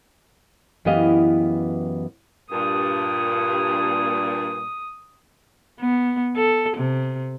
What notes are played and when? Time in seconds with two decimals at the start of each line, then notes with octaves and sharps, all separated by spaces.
0.85 F#2 E3 B3 G4 D#5 F5
2.51 G2 A#2 D#6
5.80 B3
6.36 A4
6.77 C3